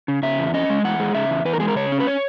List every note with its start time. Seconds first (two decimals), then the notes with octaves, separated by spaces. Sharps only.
0.08 C#3
0.23 C#3 E5
0.39 E2
0.54 C#4 D#5
0.70 G#3
0.85 E2 F#5
1.00 G#3
1.15 C#3 E5
1.30 E2
1.45 E2 B4
1.53 A#4
1.60 G#3 G#4
1.68 A#4
1.76 C#3 C#5
1.92 C#4
2.00 B4
2.07 C#5